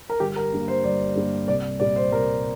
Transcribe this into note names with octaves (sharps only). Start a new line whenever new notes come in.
A#4
G1 G4
A#4
G2 G3 A#3
C5
G1 D5
G2 G3 A#3
C2 D5
A#2 G3 D5
C5
C2 A#4